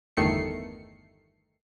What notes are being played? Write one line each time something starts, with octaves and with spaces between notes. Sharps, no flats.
G1 E2 D#3 A3 C7 C#7